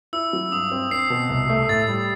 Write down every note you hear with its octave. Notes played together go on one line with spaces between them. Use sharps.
E4 E6
F#3
G2 D#6
C4
C4 C7
B2
C2
A3
A2 A6
G3